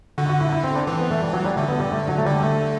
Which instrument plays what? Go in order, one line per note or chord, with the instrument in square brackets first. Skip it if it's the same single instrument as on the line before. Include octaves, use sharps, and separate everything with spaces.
[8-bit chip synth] D3 [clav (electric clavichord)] F#4
[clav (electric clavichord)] F#4
E4
E4
C4
D4
[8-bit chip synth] E3 [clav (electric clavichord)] C4
[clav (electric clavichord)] B3
A3
G3
F#3
G3
[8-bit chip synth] D3 [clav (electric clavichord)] A3
[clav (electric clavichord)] B3
G3
A3
F#3
A3
[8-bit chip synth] D3 [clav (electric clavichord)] G3
[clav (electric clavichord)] A3